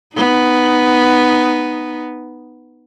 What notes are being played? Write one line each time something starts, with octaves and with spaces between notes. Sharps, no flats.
B3 D#4